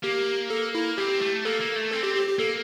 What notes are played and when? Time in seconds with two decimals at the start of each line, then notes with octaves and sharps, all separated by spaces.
0.03 A#3 G4
0.50 A4
0.75 E4
0.98 C4 G4
1.21 A3
1.45 A#3 A4
1.60 A#3
1.76 A3
1.91 C4 A4
2.03 G4
2.15 G4
2.27 G4
2.39 A#3 A4